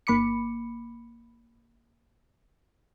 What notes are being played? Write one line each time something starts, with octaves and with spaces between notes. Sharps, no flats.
G1 A#3 B5 D6 C#7